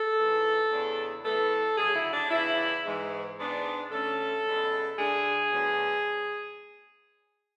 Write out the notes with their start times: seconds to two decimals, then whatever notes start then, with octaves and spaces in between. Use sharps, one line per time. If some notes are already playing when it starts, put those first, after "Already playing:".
Already playing: A4
0.17 G#2 E3 A3
0.70 E2 C#3 E3 B3 D4
1.24 A2 E3 B3 A4
1.77 D2 C#3 F#3 G#4
1.96 E4
2.13 D4
2.31 E2 C#3 E3 E4
2.84 G#2 E3 G#3
3.38 G#2 G#3 B3 D4
3.91 D2 D3 A3 C#4 A4
4.45 E2 B2 G#3 C#4
4.98 D2 D3 A3 D4 G#4
5.52 D2 D3 F#3 B3 D4